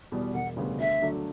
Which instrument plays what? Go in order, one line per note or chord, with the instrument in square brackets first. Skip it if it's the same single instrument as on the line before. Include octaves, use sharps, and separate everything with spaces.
[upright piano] E2 B2 G3
[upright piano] E1 [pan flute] F#5
[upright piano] D2 C#3 G3 B3
[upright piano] D2 [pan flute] E5
[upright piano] D3 F#3 A3